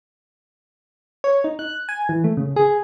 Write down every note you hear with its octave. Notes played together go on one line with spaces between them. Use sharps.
C#5
D#4
F#6
G#5
E3
A3
C#3
G#4